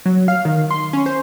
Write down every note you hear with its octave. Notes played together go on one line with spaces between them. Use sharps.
F#3
F5
D#3
C6
C#4
C5